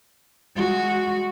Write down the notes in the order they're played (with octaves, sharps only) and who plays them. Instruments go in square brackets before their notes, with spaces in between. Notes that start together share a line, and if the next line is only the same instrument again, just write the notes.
[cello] G#3 F#4